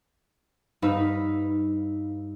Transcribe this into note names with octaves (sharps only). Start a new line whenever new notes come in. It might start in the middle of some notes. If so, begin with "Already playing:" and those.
G2 D#4 B4 F5 B5 E6